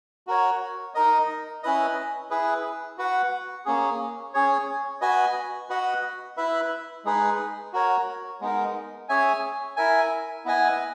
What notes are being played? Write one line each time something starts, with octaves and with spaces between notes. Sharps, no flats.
F#4 A#4 C#5
D#4 A#4 D#5
C#4 E4 B4 D#5
E4 G#4 B4
F#4 B4 F#5
A#3 C#4 G#4
C#4 G#4 C#5
F#4 B4 D#5 G#5
F#4 B4 D#5 F#5
E4 B4 E5
G#3 D#4 G#4 B4
F#4 A#4 C#5
G#3 B3 D#4 A#4
C#4 G#4 C#5 E5 G#5
E4 A#4 E5 G#5
B3 E4 B4 D#5 G#5